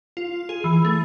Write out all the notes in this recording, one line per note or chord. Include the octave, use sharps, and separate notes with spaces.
F4
G#4
E3
A3